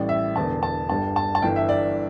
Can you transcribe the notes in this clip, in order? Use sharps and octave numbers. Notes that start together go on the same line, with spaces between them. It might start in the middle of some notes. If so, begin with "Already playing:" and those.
Already playing: A1 A2 G3 D5
E5
E1 E2 D3 A5
A5
G1 G2 G3 A5
A5
A5
G1 G2 E3 G5
E5
D5